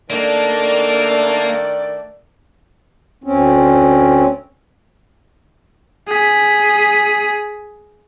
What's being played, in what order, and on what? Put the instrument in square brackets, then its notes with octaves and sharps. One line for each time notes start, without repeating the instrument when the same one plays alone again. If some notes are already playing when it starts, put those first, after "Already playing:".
[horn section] D#3 A3 [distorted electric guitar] A#3 [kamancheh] D4 A#4 [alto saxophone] D5
[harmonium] D2 C4 C#4
[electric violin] G#4 B6